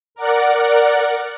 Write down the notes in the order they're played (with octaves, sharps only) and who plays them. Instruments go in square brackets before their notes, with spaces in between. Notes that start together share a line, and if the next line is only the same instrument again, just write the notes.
[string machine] A#4 D5 F#5